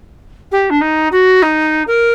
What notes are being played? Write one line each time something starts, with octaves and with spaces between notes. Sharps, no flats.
G4
D4
D#4
F#4
D#4
A#4